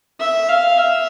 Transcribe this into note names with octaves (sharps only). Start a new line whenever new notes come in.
E5
F5
E5